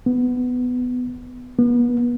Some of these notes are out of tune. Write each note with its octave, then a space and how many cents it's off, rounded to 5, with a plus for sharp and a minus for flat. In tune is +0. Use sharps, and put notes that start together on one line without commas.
B3 +10
B3 -35